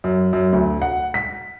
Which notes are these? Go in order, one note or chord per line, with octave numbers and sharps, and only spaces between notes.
F#2
F#2
D2
F#5
B6